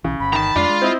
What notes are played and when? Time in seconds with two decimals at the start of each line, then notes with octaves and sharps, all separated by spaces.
0.04 B1 C#3 E3
0.20 G1 B5
0.33 D#3 A5 A#5
0.56 F2 G#3 D4 F4
0.69 G#3
0.82 C4 E4 D#5